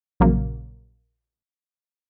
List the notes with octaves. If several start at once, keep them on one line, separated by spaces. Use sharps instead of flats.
A#1 C#3 F#3 A#3